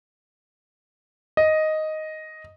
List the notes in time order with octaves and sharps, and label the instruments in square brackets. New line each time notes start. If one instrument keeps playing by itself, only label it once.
[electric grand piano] D#5